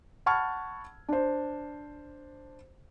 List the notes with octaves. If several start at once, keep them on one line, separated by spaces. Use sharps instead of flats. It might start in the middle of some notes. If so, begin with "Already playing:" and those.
F#5 A5 B5 C#6 F6 G#6
D4 C5